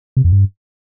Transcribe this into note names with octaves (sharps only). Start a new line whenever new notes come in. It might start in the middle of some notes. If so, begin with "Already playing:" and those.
C3
F2
G2